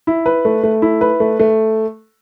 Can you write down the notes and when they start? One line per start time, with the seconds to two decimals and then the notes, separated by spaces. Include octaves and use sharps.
0.07 E4
0.26 B4
0.45 A3
0.64 A3
0.82 E4
1.01 B4
1.20 A3
1.40 A3